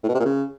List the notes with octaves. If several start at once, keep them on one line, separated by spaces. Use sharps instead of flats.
A2
B2
C3
A#2
C#3